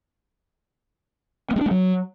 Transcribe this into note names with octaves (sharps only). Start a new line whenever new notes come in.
B3
G#3
D4
A3
F#3